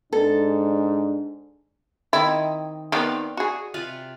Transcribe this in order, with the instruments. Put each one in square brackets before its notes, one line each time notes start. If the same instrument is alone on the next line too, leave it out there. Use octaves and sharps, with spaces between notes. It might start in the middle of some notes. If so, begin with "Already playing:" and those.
[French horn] G#2 [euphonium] D4 [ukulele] A4
[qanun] D#3 C4 D#5 [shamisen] E4
[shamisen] D#3 B3 C4 [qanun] D5 F5
[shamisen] F#4 G#4
[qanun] C3 F4 B4